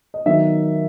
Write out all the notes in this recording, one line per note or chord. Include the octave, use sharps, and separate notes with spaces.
D#5
D#3 F#3 B3 D#4 E5